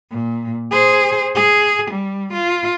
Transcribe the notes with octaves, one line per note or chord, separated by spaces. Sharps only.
A#2
G#4 C5
G#4
G3
F4